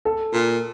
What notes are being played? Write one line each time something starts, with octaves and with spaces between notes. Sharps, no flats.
A4
A#2